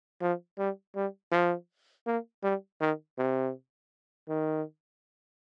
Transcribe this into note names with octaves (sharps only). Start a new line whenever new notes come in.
F3
G3
G3
F3
A#3
G3
D#3
C3
D#3